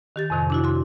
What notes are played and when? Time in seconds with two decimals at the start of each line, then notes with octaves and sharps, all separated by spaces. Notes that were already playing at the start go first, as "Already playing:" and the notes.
0.16 D#3 G4 A6
0.30 F2 A2 C3 D#3
0.50 D4 E4 F#4
0.64 F#4 C6